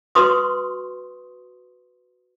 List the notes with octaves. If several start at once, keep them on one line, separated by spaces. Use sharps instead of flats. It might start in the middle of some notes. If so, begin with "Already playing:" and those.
F#4 B4 C6 C#6 D#6